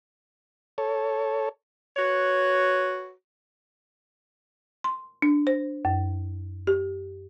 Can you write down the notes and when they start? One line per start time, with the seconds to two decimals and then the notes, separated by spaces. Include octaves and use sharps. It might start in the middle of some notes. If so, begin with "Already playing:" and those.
0.78 A4 C#5
1.97 F#4 B4 C#5
4.84 C6
5.22 D4
5.47 C5
5.85 F#2
6.67 G4